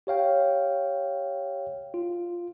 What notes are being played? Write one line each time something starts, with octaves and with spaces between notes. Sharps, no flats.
G4 C#5 F5 G5
F4